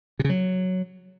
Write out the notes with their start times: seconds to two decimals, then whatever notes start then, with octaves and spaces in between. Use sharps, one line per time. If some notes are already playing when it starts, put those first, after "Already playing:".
0.19 C3
0.24 C#3
0.29 F#3